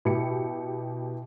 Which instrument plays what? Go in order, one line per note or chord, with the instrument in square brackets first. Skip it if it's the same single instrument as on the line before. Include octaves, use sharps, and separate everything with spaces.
[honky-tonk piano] B2 G4 C#7 [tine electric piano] E4